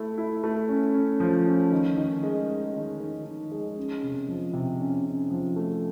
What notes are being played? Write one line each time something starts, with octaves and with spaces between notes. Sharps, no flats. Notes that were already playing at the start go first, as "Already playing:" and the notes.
Already playing: A3 E4
E4
A3
C#4
C#4
F3
C#4
D#3
D#3
G#3
G#3
D#3
D#3
D#3
G#3
C#4
C3
F3
C3
C#4
C#4
F3
A3